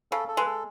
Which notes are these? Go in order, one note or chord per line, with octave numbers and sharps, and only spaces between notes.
C#3 A4
A4
G#3 B4
A4